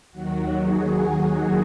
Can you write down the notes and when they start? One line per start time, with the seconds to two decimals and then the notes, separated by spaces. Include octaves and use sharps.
0.12 D#2 D#3 F#3 F#4
0.59 G#4
1.07 G#4